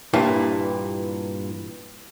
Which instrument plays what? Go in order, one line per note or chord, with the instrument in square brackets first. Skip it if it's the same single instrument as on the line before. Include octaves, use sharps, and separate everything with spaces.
[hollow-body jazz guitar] G2 A#2 E3 E4